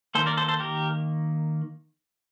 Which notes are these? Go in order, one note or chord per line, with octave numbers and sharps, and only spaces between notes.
D#3 A#3 A4 C5
A#4 D5
A4 C5
A4 C5
G4 A#4